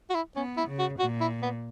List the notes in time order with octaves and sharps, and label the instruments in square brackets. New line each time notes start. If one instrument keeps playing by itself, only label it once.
[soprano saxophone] F#4
E4
[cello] B3 [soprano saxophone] C#4
[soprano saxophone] E4
[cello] C#3
[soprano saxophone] F#4
[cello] A#2 [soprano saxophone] F#4
[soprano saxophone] E4
B3